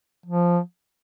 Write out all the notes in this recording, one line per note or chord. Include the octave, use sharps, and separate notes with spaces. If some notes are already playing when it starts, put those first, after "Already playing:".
F3